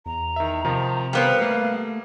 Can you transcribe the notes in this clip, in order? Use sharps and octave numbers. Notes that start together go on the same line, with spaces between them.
E2 A#5
D#3 E5
C3 D#3 F3 D#4
G3 B3 A#4 C5 F5 G5
A3 A#3